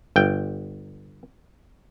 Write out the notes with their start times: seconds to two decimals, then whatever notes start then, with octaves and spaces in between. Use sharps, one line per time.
0.16 G1 G5